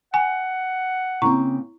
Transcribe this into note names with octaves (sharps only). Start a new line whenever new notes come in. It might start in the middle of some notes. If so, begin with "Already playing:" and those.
F#5 G#5
C#3 A#3 C4 E4 A#5 C#6